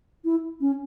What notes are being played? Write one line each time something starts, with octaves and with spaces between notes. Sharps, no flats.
E4
C#4